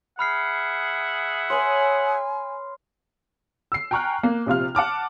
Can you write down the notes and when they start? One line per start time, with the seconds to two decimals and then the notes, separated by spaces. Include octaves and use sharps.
0.19 G#4 E5 F#5 B5 F6 C7
1.50 B4 C#5 G#5 C6
3.72 E6 C7
3.91 G5 G#5 A#5 C#6 F6 F#6
4.23 A#3
4.46 A#1 C3 F4 F6
4.75 F#5 A5 D6 F6